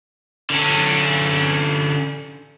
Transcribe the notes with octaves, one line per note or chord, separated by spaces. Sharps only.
D3 C#4